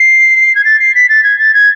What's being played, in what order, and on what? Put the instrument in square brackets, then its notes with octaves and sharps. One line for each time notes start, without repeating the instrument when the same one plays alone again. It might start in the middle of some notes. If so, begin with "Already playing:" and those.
Already playing: [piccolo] C7
G#6
A6
C7
B6
A6
G#6
A6
G#6